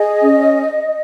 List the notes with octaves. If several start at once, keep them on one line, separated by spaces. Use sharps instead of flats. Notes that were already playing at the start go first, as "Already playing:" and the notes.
Already playing: G#4 D#5
C#4